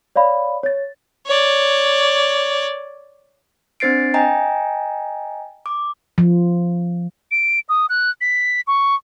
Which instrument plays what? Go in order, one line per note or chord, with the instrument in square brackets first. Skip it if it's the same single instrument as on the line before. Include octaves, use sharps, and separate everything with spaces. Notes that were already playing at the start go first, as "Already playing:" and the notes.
[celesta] C#5 D5 F5 B5
C#5 A6
[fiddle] C#5 D5
[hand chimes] C4 D4 C5 A6 C7 D7
D#5 G5 G#5 A#5
D6
[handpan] F3
[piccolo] D7
D#6
F#6
B6
C#6